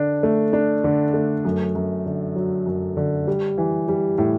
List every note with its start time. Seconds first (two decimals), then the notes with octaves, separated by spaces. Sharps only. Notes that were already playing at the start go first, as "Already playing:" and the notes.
Already playing: D3 D4
0.23 A3
0.53 D4
0.84 D3
1.14 A3
1.45 F#2
1.75 F#2
2.06 D3
2.36 F#3
2.66 F#2
2.97 D3
3.27 G3
3.58 E3
3.88 G3
4.18 A2